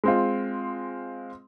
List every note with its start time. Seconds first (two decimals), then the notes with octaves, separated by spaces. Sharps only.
0.04 G#3 C4 F4